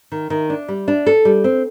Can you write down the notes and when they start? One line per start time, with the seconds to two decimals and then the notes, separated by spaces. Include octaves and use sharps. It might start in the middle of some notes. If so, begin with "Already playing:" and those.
0.12 D#3
0.30 D#3
0.50 D4
0.68 G3
0.88 D4
1.07 A4
1.25 G3
1.44 C4